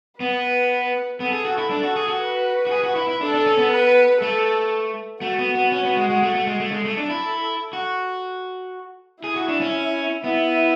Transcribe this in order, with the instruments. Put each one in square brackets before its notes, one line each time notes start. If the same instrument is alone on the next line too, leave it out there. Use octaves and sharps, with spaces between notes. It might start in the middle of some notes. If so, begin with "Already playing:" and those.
[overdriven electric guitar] B3 [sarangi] B4
[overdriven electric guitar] B3 [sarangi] A4
[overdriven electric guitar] G#4
F#4
E4
D4
F#4
G#4
F#4
[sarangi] B4
[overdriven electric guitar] F#4
G#4
F#4
E4
E4
[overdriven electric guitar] D4 [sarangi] A4
[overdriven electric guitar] D4
C#4
B3
[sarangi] B4
[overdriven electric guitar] A3 [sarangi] A4
[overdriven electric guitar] A3 [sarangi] F#4
[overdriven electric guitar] B3
B3
C#4
B3
G#3
G#3
A3
A3
G#3
A3
[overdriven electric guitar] G#3 [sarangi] A4
[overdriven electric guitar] A3
D4
E4
F#4
[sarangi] E4 [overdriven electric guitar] G#4
[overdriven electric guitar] F#4
D4
C#4
[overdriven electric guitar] B3 [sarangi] E4